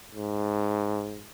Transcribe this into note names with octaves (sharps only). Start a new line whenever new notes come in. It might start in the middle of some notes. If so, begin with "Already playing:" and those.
G#2